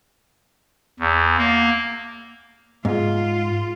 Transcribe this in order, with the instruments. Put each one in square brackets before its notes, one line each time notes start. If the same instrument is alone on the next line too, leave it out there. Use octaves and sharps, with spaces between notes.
[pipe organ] E2
A#3
[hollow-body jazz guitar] G#2 [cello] F4